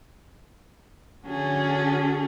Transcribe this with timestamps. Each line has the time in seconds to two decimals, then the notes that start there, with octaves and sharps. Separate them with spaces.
1.27 D3 C#4 F#4 G#4 A4